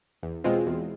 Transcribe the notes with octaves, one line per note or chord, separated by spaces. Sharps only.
E2
B2 G#3 C4 F4
E2